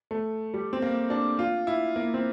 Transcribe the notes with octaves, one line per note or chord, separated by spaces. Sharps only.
A3
G3
C4
A#3
D4
F4
E4
A#3
C4